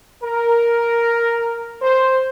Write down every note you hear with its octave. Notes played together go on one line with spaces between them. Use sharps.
A#4
C5